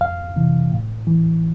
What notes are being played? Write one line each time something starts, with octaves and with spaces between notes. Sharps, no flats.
F2 F5
C3 E3
A2
E3